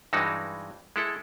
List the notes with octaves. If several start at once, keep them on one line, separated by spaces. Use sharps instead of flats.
G2 E3 G#3 D#4 F#4
G#3 E4 A4